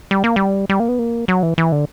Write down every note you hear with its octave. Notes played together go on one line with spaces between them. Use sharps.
G3
A#3
G3
G3
A#3
B3
A#3
F#3
E3
E3
D3